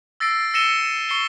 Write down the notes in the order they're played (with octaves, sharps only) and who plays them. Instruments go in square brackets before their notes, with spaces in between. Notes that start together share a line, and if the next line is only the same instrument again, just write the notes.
[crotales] E6 A6 A#6 C7 D7
E6 A#6 C#7 D#7 E7 G7
C#6 C7 C#7 G7